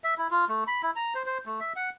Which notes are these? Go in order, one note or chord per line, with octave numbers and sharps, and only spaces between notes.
E5
E4
F4
A3
B5
E4
A#5
C5
C5
A3
E5
F#5